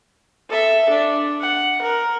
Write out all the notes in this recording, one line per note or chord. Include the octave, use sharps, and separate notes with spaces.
A4 E5
D4
F#5
A#4